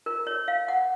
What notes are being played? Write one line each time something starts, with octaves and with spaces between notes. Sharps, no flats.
A#4
C#5
F5
F#5